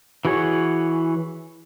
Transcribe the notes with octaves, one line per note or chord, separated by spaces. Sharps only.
E3 F#4 G#4 C#5